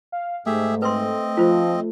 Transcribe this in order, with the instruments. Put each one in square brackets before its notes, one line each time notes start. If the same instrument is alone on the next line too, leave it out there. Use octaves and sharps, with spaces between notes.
[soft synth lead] F5
[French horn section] G#2 [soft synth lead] A3 [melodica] G4 G#4 E5
[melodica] C4 D#5 [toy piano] B4 C6
[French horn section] F3 [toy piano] F4 C5